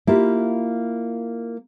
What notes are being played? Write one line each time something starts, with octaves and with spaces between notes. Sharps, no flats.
A#3 E4 F4 G4